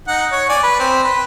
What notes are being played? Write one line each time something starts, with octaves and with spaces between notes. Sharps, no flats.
D#4 F#5
C#5
D5 G#5
B4
C4
B4